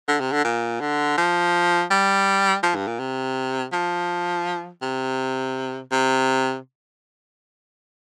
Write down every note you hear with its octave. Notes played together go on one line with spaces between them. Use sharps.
D3
C3
D3
A#2
D3
F3
G3
F3
G2
A#2
C3
F3
C3
C3